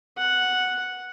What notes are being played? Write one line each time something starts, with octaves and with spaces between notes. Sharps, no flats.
F#5